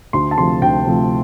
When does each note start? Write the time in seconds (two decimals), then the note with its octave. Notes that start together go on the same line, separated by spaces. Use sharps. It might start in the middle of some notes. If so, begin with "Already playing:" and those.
0.13 D2 C6
0.31 A5
0.38 C3 F3 A3 C6
0.62 D2 G5
0.86 C3 F3 A3